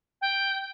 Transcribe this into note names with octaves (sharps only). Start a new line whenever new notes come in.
G5